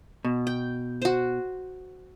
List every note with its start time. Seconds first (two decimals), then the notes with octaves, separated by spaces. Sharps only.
0.25 B2
0.47 G5
1.02 F#4 C5